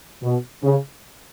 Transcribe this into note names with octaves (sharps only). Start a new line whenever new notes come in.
B2
C#3